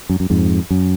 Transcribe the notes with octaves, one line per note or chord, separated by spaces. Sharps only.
F#2
F#2
F2 G#2
F#2